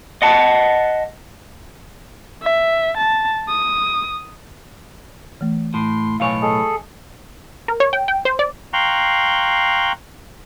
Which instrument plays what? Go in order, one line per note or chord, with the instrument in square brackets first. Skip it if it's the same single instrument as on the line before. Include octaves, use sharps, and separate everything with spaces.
[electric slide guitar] D#5 F#5 A5
[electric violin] E5
A5
D#6
[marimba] E3 A3
[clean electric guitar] A2 [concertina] C6
[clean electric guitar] B1 A2 C#5 [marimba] F5 G#5
[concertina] G#4 A4 [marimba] D#5
[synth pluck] A#4
C#5
G5
G5
C5
D5
[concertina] F5 G5 A#5 C6 C#6 F#6